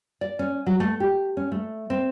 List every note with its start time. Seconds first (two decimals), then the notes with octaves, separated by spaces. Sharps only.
0.21 D5
0.39 C#4
0.66 F#3
0.80 A3
1.00 G4
1.37 C#4
1.52 A3
1.90 C4